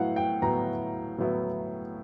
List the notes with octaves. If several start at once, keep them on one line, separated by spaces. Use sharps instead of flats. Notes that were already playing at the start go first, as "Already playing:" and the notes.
Already playing: A2 F#3 B3 E4 F5 F#5
G5
A2 F#3 B3 E4 A#5
A2 F#3 B3 E4